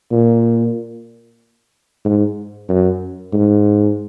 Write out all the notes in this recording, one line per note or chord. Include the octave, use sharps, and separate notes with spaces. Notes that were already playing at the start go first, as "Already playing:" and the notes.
A#2
G#2
F#2
G#2